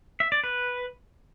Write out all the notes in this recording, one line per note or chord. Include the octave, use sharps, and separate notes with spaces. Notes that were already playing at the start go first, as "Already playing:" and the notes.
E5
D5
B4